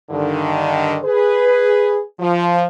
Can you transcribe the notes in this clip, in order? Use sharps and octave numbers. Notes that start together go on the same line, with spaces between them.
G2 D3 D#3
G#4 B4
F3